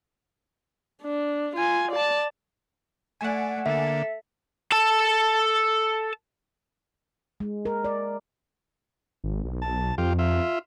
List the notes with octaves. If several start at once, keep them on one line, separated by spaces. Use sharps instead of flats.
D4
F4 G#5
D5 A5
A3 D5 F#5 G#5
D3 A#3 A4 E5
A4 A5
G#3
A#4
D5
G#1
B1
A5
F2 F4 G4
F4 E5